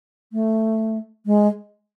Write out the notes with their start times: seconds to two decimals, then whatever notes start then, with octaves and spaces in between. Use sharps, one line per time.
0.32 A3
1.26 G#3